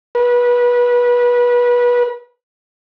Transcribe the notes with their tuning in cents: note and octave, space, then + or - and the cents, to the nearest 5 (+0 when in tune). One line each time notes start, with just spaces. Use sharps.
B4 -25